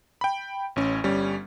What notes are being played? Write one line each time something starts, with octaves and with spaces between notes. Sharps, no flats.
G5 B5
A1 C#4
G1 G3 C#4